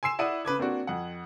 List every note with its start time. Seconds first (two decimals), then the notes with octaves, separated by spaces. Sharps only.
0.03 G#5 C6 E6 C7 E7
0.19 E4 D5 F#5 D#6 D#7
0.45 C#3 B4 D6 G#6
0.58 A#3 C4 D4 F#4
0.87 F2 F#5